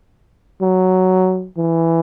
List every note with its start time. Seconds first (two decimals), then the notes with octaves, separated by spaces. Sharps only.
0.61 F#3
1.57 E3